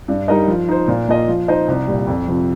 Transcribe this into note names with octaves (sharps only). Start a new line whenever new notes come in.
G2
G3 D#4 A#4 D#5
F3
D#4 C5
A#2
A#3 F4 D#5
F3
D#4 C5 D#5
C2
A#2 G3
F2
C3 F3 C4